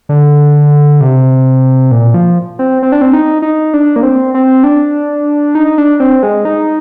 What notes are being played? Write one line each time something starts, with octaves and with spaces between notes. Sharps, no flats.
D3
C3
A#2
F3
C4
C4
D4
C4
D#4
D#4
D4
A#3
C4
C4
D4
D#4
D4
C4
G#3
D#4